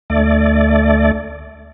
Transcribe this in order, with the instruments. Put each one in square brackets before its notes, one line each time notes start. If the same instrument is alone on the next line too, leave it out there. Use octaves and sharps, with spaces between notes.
[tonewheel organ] D2 A3 D5